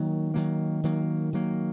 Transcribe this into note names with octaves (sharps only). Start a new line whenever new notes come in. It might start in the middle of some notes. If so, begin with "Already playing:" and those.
Already playing: D#3 F#3 A#3
D#3 F#3 A#3
D#3 F#3 A#3
D#3 F#3 A#3